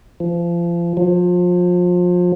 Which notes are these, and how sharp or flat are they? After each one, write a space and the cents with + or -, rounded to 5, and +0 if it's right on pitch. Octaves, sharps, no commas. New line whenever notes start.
F3 -30
F3 +30